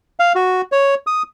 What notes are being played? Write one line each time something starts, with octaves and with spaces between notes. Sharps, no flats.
F5
F#4
C#5
D#6